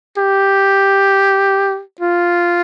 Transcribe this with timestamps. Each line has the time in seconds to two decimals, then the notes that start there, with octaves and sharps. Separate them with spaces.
0.18 G4
2.01 F4